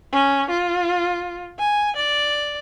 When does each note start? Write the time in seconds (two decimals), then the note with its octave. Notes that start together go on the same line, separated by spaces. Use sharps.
0.12 C#4
0.50 F4
1.59 G#5
1.96 D5